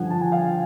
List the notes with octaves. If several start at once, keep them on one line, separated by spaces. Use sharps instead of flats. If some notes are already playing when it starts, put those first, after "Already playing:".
Already playing: G2 D3 F3 F#5 G#5
A5
G#5
F5 G5